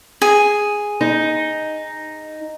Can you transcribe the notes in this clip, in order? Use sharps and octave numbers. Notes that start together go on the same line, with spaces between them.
G#4
D#4